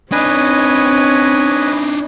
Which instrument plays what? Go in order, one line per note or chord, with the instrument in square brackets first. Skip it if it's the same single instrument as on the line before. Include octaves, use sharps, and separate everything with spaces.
[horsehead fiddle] C4 [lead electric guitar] D4 D#4 [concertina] B4 D#5 G#5 [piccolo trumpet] C#5